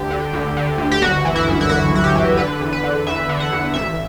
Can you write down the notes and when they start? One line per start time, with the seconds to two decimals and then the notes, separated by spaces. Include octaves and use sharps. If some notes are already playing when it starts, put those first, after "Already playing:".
Already playing: D2 D3 G4
0.11 D3
0.33 D2
0.57 D3
0.78 D2
0.92 G4
1.02 G1 F#4
1.25 E3
1.36 E4
1.48 F#2
1.61 E4
1.69 G1 F#4
1.92 G1 F#4
2.04 G4
2.15 E3
2.37 D3 B4
2.60 E2
2.73 B4
2.84 D3
3.07 E2 E5
3.29 D3
3.40 F#5
3.52 E2
3.74 A1 E5